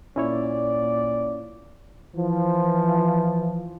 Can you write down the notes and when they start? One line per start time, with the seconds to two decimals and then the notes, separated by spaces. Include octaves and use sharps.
0.16 A#2 C#4 E4 C#5 D5
2.15 E3 F3